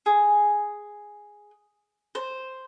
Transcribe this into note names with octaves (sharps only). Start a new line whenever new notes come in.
G#4
C5